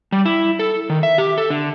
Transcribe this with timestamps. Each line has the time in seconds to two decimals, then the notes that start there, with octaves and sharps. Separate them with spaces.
0.12 G3
0.26 E4
0.59 A4
0.90 D#3
1.03 E5
1.18 G4
1.38 A4
1.50 D3